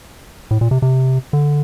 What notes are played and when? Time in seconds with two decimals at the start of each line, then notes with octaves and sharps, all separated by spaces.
0.51 A2
0.61 A#2
0.71 C3
0.82 C3
1.33 D3